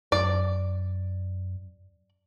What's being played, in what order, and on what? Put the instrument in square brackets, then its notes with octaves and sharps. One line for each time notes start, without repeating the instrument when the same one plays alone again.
[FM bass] F#2 [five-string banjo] D5